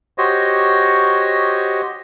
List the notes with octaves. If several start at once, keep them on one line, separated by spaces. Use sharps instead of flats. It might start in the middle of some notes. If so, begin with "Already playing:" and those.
F#4 G4 C5 C#5 D#5